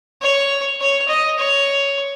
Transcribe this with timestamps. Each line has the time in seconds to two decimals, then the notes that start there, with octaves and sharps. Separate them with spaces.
0.22 C#5
0.81 C#5
1.09 D#5
1.38 C#5